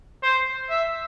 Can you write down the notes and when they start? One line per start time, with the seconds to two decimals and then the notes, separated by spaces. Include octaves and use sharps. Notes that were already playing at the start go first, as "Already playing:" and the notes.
0.23 C5
0.70 E5